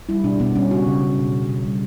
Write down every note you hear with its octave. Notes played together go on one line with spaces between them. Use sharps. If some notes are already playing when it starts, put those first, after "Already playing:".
G3 E4
B2 D4
B2 B3
G3 C#4
C#3 F#4
C#3
C#3
B2
B2
B2
G3